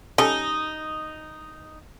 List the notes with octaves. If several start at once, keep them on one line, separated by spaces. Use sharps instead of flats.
G3 C#4 D#4 A4